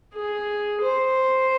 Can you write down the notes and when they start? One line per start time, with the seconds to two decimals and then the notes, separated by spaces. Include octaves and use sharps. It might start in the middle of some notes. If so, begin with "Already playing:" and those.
0.14 G#4
0.82 C5